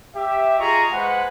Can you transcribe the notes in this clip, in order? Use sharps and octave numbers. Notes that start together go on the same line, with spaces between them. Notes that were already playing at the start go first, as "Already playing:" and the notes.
G4 E5
F4 G#4 D#5 A#5 C#6
G#3 B4 C5 F#5